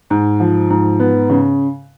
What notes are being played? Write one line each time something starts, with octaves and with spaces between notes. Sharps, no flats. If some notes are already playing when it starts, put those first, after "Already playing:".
G#2
F3
G#2
B3
C#3